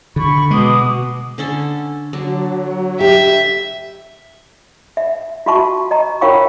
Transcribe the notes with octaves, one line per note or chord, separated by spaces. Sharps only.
D3 B5 C#6
B2 G#3 D6 D#6
D3 C#4 A4
D3 F#3 D4
G4 E5
E5
F4 F#4 E5 A5 C#6
D#5 A#5
F4 A#4 C#5 F5 G5 C#6